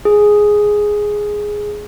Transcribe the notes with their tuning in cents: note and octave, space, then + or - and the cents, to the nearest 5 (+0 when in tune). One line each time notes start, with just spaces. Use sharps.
G#4 +0